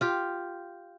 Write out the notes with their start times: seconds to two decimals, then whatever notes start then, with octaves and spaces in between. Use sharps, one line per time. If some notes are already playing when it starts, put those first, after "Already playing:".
0.01 F4 G4